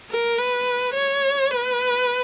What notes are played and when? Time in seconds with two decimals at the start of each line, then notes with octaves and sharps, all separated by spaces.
0.10 A#4
0.38 B4
0.95 C#5
1.51 B4